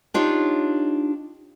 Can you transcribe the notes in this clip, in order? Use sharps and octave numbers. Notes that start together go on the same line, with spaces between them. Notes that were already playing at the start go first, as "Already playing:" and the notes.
D4 D#4 F4 G4 C#5